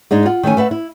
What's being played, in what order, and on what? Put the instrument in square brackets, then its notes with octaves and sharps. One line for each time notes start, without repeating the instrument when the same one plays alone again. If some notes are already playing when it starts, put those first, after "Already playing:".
[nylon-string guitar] G#2 G#3 D4 D#4
F4 F#5
D#3 A3 C#4 G#5
A3 B4 E5 F#5
E4